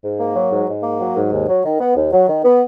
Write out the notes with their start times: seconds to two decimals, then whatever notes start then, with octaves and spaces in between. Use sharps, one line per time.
0.03 G#2
0.20 A#3
0.36 F#3
0.52 G#2
0.68 G#2
0.83 A#3
1.01 F#3
1.16 G#2
1.33 D#2
1.48 F#3
1.65 D#3
1.80 B3
1.96 D#2
2.13 F#3
2.29 D#3
2.45 B3